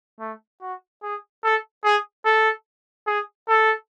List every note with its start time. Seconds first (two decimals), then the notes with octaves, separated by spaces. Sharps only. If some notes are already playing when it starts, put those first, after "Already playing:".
0.20 A3
0.61 F#4
1.03 G#4
1.43 A4
1.84 G#4
2.25 A4
3.07 G#4
3.48 A4